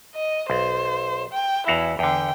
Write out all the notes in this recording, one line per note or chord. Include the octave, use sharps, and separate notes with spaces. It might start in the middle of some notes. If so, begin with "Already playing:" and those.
D#5
B1 C5
G5
E2 E4 F#4 F5
E2 D3 G5